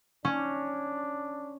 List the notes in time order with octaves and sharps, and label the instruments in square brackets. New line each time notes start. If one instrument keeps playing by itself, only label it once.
[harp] C#4 [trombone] D4